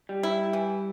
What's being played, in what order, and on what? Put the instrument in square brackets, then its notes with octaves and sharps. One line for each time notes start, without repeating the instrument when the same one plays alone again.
[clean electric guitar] G3
[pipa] E4
E3